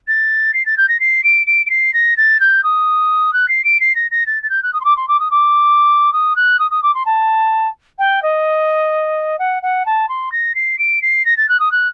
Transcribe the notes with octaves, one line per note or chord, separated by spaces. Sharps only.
A6
C7
A6
G6
A#6
C7
D7
D7
D7
C7
A#6
A6
G6
D#6
F#6
C7
D7
C7
A#6
A#6
A6
A6
G6
F#6
D#6
C6
D6
C6
D6
D#6
D6
D#6
F#6
D#6
D#6
D6
C6
A5
G5
D#5
F#5
F#5
A5
C6
A#6
C7
D7
C7
A#6
A6
F#6
D#6
F#6